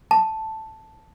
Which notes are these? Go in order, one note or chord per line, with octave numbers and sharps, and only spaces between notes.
A5